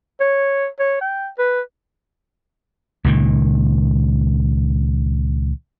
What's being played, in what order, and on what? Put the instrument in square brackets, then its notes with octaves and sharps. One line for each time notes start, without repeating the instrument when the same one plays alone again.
[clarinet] C#5
C#5
G5
B4
[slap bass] C#2 A#2 D#3